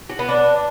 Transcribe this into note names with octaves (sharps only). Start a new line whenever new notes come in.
F#4
B3
D4